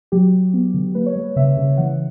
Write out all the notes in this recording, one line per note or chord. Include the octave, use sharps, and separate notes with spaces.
F#3 G4
F#3
B3
D3
A#3 B4
C#5
G3 B4
C#3 E5
C#3
E3 F#5